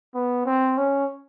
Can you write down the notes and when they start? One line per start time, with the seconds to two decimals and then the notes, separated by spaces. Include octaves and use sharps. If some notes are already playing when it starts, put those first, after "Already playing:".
0.14 B3
0.46 C4
0.77 C#4